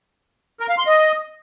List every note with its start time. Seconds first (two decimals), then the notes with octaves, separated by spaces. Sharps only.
0.60 A#4
0.69 F5
0.78 C6
0.87 D#5